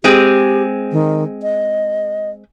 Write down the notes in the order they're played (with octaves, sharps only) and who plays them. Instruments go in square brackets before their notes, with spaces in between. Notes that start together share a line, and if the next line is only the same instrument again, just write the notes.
[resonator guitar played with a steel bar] G#3 C4 G#4 [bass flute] G4
[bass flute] D#3
D#5